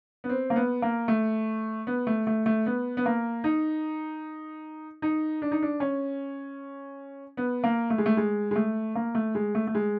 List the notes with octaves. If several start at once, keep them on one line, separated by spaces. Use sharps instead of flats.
B3
C4
A#3
B3
A#3
A3
B3
A3
A3
A3
B3
B3
A#3
D#4
D#4
D4
D#4
D4
C#4
B3
A#3
A3
G#3
A3
G#3
G#3
A3
A#3
A3
G#3
A3
A3
G#3